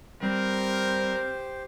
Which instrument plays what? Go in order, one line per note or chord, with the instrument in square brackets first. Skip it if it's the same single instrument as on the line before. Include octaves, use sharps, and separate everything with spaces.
[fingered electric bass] G3 [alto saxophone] C4 [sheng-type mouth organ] G4 C5 [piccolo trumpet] A#4